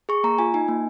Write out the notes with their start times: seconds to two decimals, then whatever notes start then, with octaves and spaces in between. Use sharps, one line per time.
0.09 G#4 C#6
0.24 A#3 A#5
0.38 F4 G#5
0.54 D#4 G#5
0.68 A#3